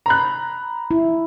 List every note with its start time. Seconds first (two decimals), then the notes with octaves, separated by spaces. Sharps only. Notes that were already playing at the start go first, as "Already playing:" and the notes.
0.06 A#5 B5 F#6
0.91 E4